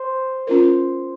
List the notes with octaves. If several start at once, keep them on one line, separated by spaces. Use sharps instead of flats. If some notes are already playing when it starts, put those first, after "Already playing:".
Already playing: C5
C#4 F4 A#4